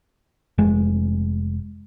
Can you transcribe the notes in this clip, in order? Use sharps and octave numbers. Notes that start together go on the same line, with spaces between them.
F1 G#3